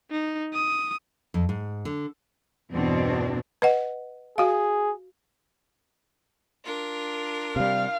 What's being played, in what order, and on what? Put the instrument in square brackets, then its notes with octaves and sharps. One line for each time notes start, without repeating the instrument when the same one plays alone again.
[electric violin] D#4
D#6
[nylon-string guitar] F2
G#2
D3
[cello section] E2 G2 B2 E3 C4 D4
[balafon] B4 D#5 F#5
[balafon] F#4 F5 [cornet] G#4
[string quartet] D4 F4 A#4
[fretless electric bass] C3 G3 [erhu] F5